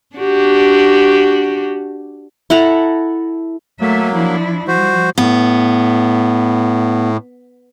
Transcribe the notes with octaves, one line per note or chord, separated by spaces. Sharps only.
D4 F#4 G4
E4 A4 F#5 A#5
F#3 A3 A#3 E5
F3 D4 E4
F3 G3 F#4 C5
A2 B3